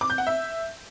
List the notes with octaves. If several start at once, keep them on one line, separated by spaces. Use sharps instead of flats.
D6
G6
F#5
E5